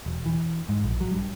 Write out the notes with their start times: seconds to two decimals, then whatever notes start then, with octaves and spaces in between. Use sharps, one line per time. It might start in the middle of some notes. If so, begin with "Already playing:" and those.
0.06 E1
0.26 E3
0.69 G#2
0.84 A#1
1.01 F#3
1.13 G2